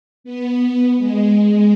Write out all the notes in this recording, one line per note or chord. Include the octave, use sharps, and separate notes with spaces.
B3
G#3